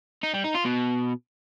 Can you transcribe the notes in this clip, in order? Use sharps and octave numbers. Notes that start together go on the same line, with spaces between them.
D#4
G3
D#4
F4
B2